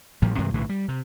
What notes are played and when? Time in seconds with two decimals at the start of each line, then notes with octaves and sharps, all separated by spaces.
0.22 A1 A2 F3 G3
0.38 G2 C3 E3 G#3
0.54 B1 A2 D3 E3
0.69 G3
0.88 C3